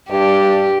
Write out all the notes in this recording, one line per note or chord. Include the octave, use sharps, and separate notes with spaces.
G2 G4 D5